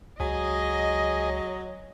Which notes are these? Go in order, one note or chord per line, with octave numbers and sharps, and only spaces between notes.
C#2 F#3 G#4 D#5